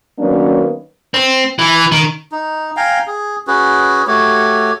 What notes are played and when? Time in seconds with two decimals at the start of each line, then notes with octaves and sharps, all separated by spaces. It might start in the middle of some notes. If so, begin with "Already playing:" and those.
0.19 D#3 F#3 A#3 B3 C#4 D4
1.14 C4
1.59 E3
1.92 D#3
2.32 D#4
2.77 F5 G5 G#5 A#5
3.07 G#4
3.47 C#4 F#4 G#4 B4
4.07 A3 F#4 G4 C#5